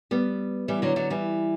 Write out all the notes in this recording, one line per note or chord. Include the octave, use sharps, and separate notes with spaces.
G3 B3
E3 G3
D3 F#3
D3 F#3
E3 G3